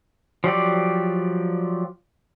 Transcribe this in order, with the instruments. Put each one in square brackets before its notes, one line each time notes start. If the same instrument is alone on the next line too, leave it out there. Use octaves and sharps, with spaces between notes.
[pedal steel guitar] F3 F#3 G4 D5